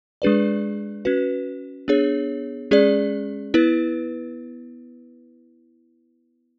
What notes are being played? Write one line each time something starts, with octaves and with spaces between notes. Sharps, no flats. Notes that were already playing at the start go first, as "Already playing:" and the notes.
G#3 D4 G#4 B4 D5
C#4 F#4 B4
B3 D4 G#4 C#5
G#3 C#4 G#4 D5
B3 E4 B4